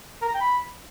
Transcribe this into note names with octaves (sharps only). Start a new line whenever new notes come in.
A#4
A#5
G5
B5